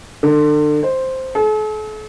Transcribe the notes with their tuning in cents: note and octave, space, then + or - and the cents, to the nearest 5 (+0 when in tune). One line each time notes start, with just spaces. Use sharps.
D3 +35
C5 +0
A4 -45